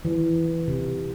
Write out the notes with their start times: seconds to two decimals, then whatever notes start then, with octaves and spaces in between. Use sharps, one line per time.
0.05 E3
0.68 C3